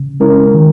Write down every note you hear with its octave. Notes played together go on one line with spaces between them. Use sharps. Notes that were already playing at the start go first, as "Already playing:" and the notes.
Already playing: C#3
G#3 C#4 E4 A#4
D#3